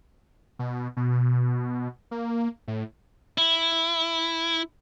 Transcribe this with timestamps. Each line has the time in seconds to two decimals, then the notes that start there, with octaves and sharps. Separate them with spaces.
0.59 B2
0.97 B2
2.11 A#3
2.68 A2
3.38 E4